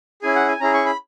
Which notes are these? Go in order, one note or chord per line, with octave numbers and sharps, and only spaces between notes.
C#4 E4 G#4 G#5
F#5
G#5
C#4 E4 G#4 A#5
C#6
B5